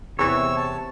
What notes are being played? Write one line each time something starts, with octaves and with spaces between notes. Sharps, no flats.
E2 C3 E3 C#5 C#6 E6
A5